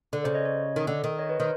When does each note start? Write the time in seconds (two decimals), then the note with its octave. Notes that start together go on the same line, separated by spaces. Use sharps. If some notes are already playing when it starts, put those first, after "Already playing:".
0.13 D3
0.24 C#3 C5 D5
0.35 C#5 D#5
0.45 C#5 D#5
0.76 D#3
0.87 D3
1.04 D#3
1.19 C#5 D#5
1.29 B4 C#5
1.39 D#3 A#4 C5